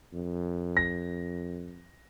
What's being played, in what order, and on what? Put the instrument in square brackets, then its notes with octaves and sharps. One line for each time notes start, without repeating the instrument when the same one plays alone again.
[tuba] F2
[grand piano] A#6